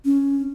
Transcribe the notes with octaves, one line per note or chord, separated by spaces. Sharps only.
C#4